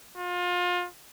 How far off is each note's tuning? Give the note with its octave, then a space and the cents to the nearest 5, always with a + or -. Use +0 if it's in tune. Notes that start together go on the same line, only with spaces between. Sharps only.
F4 +30